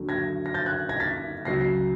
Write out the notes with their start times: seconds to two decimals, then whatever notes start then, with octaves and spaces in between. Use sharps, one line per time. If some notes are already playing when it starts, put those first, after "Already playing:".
Already playing: D#2 D3 F#3
0.09 G#6 A#6
0.46 A#6
0.54 G6 A6
0.66 F#6 G#6
0.89 G#6 A#6
1.00 A6 B6
1.45 C#2 C#3 F#3 A#6 C7